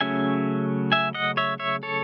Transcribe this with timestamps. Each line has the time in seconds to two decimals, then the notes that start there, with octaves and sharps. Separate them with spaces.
0.01 C#3 F#3 A3 C#4 E5 G#5
0.92 E5 G#5
1.15 D#5 F#5
1.37 C#5 E5
1.59 C#5 E5
1.83 A4 C#5